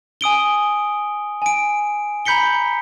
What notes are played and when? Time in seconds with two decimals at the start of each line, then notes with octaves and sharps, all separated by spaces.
0.21 G#5 D#6 D7 G7
1.42 G#5 D7
2.25 A#5 B5 G6 B6 C#7 G7